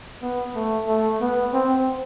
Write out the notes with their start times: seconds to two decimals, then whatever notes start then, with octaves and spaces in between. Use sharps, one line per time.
0.22 B3
0.55 A3
0.88 A3
1.21 B3
1.53 C4